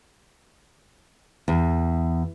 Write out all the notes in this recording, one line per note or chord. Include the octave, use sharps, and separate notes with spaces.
E2